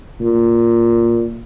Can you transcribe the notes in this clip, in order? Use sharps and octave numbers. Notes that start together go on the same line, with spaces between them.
A#2